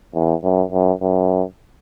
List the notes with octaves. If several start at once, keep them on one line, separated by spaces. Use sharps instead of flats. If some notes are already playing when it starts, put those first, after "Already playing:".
E2
F#2
F#2
F#2